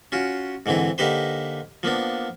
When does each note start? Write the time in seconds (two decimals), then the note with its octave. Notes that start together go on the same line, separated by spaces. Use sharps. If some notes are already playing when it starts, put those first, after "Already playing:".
0.12 C#4 F4 F#4
0.66 G#2 D3 E3 C4 E4
0.98 D3 A#3 D#4 G4 B4 C5
1.83 F3 A#3 B3 D4